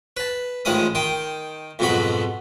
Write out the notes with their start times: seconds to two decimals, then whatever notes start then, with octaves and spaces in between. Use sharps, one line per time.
0.17 B4 A5
0.65 A1 D#3 F3 G#3 B5 D#6
0.95 D#3 G5 C6
1.79 F2 G#2 B2 F#3 F#4 B5